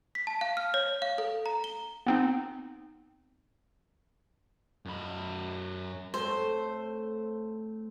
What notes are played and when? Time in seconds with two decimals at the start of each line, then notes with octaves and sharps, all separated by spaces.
0.15 B6
0.27 A5
0.41 F5
0.57 F6
0.74 C#5
1.02 F5
1.18 A4
1.46 A#5
1.64 G7
2.07 B3 C4 D#4
4.86 F#2 B5
6.14 A2 A3 C4 C5